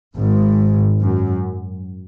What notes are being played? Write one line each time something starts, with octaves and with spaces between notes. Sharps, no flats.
G#1 G#2
F#2